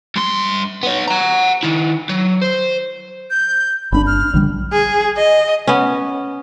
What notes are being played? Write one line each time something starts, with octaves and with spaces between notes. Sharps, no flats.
G2 C6
B3 C#5
F#5 A#5
D#3 E4
F#3
C5
G6
G1 C4 D4 B5
F6
A#1 D3 G3
G#4
D#5
B3 C#4